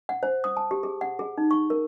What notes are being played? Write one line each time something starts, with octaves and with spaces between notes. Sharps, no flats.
F#5
C5
D#6
A5
G4
G#4
F#5
G#4
D#4
C#6
A#4